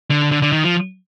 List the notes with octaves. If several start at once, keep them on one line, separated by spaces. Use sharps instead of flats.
D3
D3
D3
D#3
F3